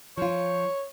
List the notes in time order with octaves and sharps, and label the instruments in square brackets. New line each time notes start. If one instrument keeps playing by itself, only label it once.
[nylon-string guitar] F3 F4 [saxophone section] C#5